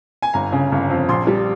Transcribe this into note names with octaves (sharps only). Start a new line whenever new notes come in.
G#5
G1 A#5
C#3
G1
F2
A#1 C6
G3